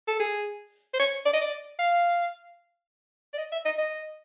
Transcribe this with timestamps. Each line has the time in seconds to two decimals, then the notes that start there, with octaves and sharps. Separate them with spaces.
0.08 A4
0.20 G#4
0.94 C5
1.00 C#5
1.25 D5
1.34 D#5
1.41 D5
1.79 F5
3.34 D5
3.38 D#5
3.52 E5
3.65 D#5
3.78 D#5